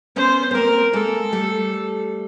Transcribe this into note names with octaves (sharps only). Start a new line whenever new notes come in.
B3 C#4 C5
B3
A#3 C4 A#4
G#3 A#3 A4
G3 A3